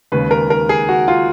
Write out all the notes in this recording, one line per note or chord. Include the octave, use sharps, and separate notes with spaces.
D#2 C#3 G#3 B4
A#4
A#4
G#4
F#4
F4